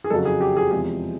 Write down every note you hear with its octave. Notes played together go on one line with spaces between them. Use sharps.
G#4
F2 C#3 F#3 A4
G#4
G4
G#4
E2 C3 F3 G#3 G#4